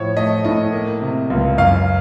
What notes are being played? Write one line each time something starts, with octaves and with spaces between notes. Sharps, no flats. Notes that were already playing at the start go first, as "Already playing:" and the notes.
Already playing: A2 F3 C#5
A3 D#5
A2 D#5
A#3
C3
C#2
F#2 F5